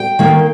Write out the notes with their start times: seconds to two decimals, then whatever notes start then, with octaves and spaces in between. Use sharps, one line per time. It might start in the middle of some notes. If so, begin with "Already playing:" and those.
Already playing: G5
0.19 D#3 A#3